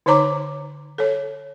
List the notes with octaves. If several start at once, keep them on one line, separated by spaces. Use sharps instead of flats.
D3 D#4 C5 C#5 A#5 D6
A4 C#5